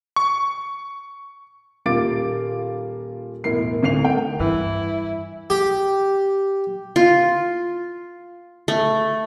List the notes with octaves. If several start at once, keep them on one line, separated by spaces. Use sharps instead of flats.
C#6
D#1 A#3 F4 D6 A6 D7
E1 A2 A#4 C7
G#1 D2 C7 F7
A3 A#4 G5 D7
G2 E3 E4
G4
F4
A3